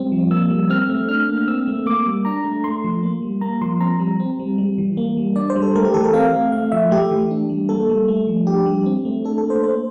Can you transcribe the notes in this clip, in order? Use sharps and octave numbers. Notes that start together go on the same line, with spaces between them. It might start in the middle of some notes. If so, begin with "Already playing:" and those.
Already playing: G3 C4
F3
A#3 E6
G3
C4 F6
A3
D4 F6
A#3
F6
C4 E6
A3
A#3 D6
G3
D4 A#5
A3
A3 C6
F3
A#3
G3
A#3 A#5
F3 C6
C4 A#5
G3
C4
G3
G3
E3
A#3
G3
D4 D5
C5
G3
A4
A3 A#4
G4
E3 A4
A#4
C4 F5
A3
A3 F5
F3 E5
A3 G4
E3
D4
G3
A#3 A4
G3
A3
F3
D4 G4
G3
C4
A3
D4 A4
A4
A#3
C5
A#3 C5